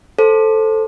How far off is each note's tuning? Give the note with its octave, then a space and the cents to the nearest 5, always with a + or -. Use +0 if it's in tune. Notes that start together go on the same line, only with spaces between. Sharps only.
A4 +0 C5 +15